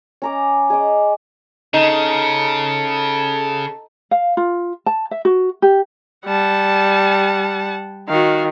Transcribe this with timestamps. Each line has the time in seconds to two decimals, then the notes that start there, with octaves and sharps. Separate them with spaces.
0.22 C#4 A#5 D6
0.70 G#4 D#5 D6
1.74 C#3 D#4 A4
4.11 F5
4.37 F4
4.86 A5
5.11 E5
5.25 F#4
5.62 G4
6.26 G3 F#5 A5
8.09 D#3 F#4 F5